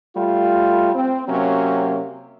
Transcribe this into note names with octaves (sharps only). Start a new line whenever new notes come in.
G3 A3 F4
C4
C3 F#3 A#3 C#4